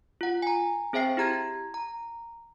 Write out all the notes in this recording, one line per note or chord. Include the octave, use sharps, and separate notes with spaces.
F4 F#5
G#5 A#5
C4 G#4 C5 E5 G5 C7
E4 G4 A#5 G#6
A#5